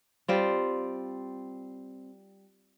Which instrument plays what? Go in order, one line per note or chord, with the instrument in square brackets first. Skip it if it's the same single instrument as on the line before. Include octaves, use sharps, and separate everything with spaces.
[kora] G3 C4 F4